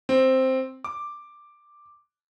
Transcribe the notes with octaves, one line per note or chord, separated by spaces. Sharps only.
C4
D6